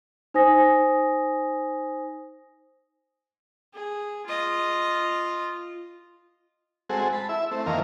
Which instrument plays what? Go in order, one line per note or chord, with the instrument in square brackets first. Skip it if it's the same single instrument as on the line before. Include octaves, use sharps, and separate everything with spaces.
[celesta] D#4 C5 G#5 D#6 A#6
[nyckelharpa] G#4
F4 D#5
[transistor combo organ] G#3 C4 F#4 G#4 A4
A5 B5
E4 E5
A3 C4
F2 D#3 E3 A#3 A#4 F5